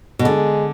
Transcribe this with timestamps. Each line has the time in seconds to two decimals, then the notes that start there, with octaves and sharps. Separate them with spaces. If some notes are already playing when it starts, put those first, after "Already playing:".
0.19 B2
0.24 D3 G#3